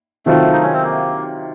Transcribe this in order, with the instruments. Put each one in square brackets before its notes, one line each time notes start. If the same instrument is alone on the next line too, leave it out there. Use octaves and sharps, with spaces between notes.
[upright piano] C3 D#3 F#3 C4 F4 [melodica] A3
[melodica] D#4
C#4
C4
A#3